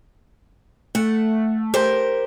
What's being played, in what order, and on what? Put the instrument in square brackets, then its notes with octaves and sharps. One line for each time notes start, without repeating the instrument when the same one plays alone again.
[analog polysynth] A3 [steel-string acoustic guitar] F#5
[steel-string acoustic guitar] G4 A#4 C5